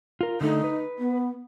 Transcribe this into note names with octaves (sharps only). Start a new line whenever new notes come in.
F4 A#4
D3 A3 D#4
B4
B3